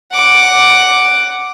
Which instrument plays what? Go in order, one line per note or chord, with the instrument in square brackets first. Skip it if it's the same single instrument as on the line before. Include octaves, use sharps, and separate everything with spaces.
[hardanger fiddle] F#5 D6